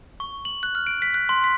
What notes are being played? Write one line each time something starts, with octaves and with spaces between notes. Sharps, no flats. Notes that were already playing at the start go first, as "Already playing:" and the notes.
C#6
F#7
F#6
F6
D7
B6
F#6
C6
B6